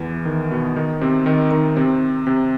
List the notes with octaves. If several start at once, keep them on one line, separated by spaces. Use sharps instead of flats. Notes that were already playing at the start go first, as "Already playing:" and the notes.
Already playing: E2 E3
D#3
B2 B3
D#3 D#4
C3 C4
D#3 D#4
D#3 D#4
C3 C4
C3 C4